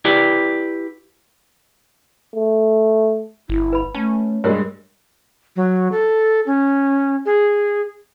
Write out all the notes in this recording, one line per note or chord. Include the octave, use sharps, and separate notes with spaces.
E4 G4 B4 D5
A3
G1 E4
B4 B5
A3 C#4 A5
G2 G#3 G4 A#4 C#5
F#3
A4
C#4
G#4